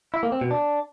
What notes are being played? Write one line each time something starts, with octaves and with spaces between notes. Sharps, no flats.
E4
A#3
C4
B2
D4